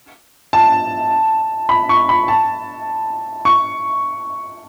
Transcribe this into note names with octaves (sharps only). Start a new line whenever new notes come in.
A5
B5
C#6
B5
A5
C#6